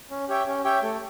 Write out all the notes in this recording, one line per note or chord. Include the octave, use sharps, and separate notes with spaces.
C#4
G4 C#5 E5 G5
C#4
G4 C#5 E5 G5
A3